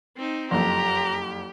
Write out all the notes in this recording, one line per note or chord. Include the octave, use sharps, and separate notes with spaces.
C4 D#4
F#1 F2 G4 A#5